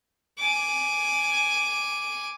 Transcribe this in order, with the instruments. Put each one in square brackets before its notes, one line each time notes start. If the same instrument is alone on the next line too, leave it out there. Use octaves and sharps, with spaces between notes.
[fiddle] G#5 D6